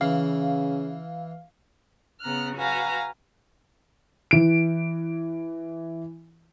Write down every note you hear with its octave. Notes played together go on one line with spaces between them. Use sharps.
C#3 E3 F5
C#3 B3 A#5 F6 F#6
F#4 B4 F5 G#5 A#5
E3 D7